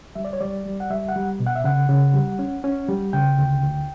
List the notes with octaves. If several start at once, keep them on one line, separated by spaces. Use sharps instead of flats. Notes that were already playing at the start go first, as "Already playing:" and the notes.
G3 E5
D5
C#5
G3 D5
G3
F#5
G3 E5
F#5
G3
B2
F#5
E5
C#3 F#5
C#3
G3
C#4
C#4
G3
C#3 G5
D2
D2